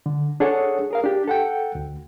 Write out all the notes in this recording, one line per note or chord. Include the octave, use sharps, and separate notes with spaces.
D3
D4 G#4 A4 C#5 F#5
G#4 A#4 F5
D4 G4
A4 F#5 G5
D2